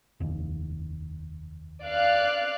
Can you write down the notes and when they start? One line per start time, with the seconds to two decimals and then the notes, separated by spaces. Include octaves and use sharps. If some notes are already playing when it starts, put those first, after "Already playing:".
0.20 F1 D#2
1.83 D5 F5 F#6